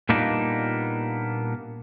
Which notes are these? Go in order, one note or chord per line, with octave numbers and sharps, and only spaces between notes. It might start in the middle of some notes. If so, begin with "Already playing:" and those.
A#2 G3 A#3 B3 D4 D#4